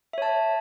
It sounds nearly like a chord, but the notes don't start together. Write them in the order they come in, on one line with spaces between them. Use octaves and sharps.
E5 C#5 A5